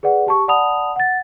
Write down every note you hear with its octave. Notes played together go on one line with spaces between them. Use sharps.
G#4 B4 D5 F#5
G4 A5 C#6
D5 F#5 A5 B5 D#6 F7
F#5 A6